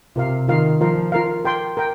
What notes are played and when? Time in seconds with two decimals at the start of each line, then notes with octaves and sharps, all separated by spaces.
0.16 C3 F4 A#4 F5
0.48 D#3 F4 A#4 F5
0.81 F3 F4 A#4 F5
1.12 F4 A#4 F5
1.45 A#4 G5 C6
1.77 A#4 G5